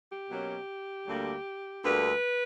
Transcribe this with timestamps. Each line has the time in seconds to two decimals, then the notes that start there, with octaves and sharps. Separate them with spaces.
0.10 G4
0.30 B2 F#3 A#3 C#4
1.07 D2 D3 G3 A#3
1.84 D2 D3 G3 A#3 B4